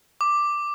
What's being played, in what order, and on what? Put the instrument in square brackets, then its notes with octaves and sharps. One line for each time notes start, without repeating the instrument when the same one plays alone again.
[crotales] D6